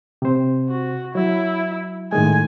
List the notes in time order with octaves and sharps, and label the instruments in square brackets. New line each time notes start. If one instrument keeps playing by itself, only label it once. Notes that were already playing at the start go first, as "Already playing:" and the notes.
[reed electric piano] C3 C5
[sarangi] F#4
[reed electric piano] F#3 [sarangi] E4
[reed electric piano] A2 D#3 G#3 [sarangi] G#5